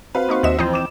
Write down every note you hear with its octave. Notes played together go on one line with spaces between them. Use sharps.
C4 F#4 B4 C5 F5
A#3 D#4 C#6
D#2 D#5 E5 F#5 E7
F2 E3 C4 C5 D#5 G5
D6 E7